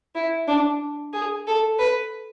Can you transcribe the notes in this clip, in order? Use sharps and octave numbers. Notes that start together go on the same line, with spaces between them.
E4
D4
G#4
A4
B4